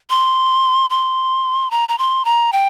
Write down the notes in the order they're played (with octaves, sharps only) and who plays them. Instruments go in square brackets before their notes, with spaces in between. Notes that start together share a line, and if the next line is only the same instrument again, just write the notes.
[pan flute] C6
C6
A#5
A#5
C6
A#5
G5